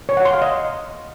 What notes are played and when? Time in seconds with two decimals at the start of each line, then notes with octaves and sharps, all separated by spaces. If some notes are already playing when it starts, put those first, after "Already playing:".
0.09 C#5
0.17 F#5
0.25 C6
0.33 F5
0.42 D#5